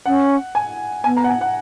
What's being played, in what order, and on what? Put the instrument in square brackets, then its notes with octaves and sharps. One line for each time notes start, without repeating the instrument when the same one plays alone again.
[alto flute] C#4 [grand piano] F#5
[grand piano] G#5
[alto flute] B3 [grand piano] G#5
[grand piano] A#5
F#5
G#5
F#5